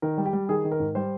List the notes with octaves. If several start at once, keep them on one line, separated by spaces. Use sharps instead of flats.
D#3 A#4
G3
G4
G3
D#3 G#4
D#3
A#4
G#2
G3 C5